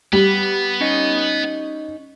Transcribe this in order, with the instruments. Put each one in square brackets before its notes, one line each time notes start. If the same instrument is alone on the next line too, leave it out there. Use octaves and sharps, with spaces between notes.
[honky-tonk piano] G3 [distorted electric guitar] B3
[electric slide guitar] C#4 D#4 D#5